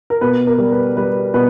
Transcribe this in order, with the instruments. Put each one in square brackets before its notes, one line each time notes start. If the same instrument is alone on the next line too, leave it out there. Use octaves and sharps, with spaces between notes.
[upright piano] A#4
B2 B4
A#4
G3
B4
G3 B4
B2 B4